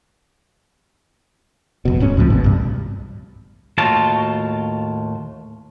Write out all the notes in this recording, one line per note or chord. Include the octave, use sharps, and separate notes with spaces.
F1 B2
D1 G#2 C#4
C#2 A2 F3 C4
G#1 B2
C2 G2
D#2 A2 F4 F#4 A5